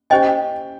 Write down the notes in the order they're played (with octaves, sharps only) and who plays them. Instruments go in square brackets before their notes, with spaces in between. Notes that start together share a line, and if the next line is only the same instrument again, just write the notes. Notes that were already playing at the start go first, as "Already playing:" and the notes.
[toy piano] C#4 G4 C5 D#5 G#5 [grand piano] G5